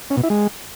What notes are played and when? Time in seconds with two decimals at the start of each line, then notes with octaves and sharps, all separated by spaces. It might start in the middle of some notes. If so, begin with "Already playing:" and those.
0.10 C#4
0.17 B2
0.23 E4
0.30 G#3